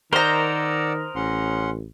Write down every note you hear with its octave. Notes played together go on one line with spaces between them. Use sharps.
D#3 A#4 C5 D5 D#5 F#5 A#5 E6
A1 C#4 F#5 C6